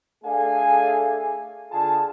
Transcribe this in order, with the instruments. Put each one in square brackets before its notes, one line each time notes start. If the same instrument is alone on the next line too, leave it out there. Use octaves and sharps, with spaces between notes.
[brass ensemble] A3 D4 G#4 A4 F5 G#5
D3 F4 G#4 A5